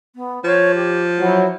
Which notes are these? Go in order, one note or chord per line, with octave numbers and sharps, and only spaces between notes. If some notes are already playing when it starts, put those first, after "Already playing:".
B3
F3 C#5
G4
F#3 E4